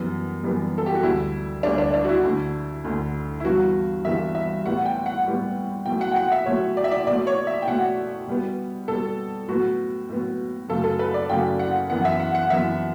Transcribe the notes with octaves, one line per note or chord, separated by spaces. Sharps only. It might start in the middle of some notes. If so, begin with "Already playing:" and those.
Already playing: F#2 E3 G3 B3
F#2 E3 G3 B3
A4
G4
F#4
D2 D3 G3 E4
D2 D3 G3 D4
D4
D4
F#4
E4
D2 D3 A3
D2 D3 A3
E4
G2 E3 G3 B3 F#4
G2 E3 G3 B3 E5
E5
A2 G3 B3 F#5
G5
F#5
A2 G3 B3
B2 F#3 A3 G5
F#5
G5
F#5
E5
B2 F#3 A3 C#5
D5
E5
D5
B2 A3 D5
C#5
E5
G5
B2 A3 F#5
B2 G3 B3
B2 G3 B3 A4
A2 F#3 B3 F#4
A2 F#3 B3
F#2 C#3 F#3 A3 A4
A4
B4
D5
F#2 C#3 F#3 A3 G5
F#5
F#2 E3 B3 F#5
E5
F#5
F#5
F#2 E3 B3 E5